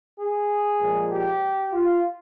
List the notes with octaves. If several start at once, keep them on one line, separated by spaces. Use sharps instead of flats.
G#4
A#2 F3 G#3
G4
F4